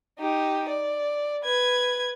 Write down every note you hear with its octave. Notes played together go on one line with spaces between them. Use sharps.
D#4 G4
D5
B4 G#6